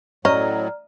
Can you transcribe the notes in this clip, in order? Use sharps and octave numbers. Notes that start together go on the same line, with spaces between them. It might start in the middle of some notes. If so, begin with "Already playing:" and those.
A2 F#3 C#4 D5 D#5 A#5 F6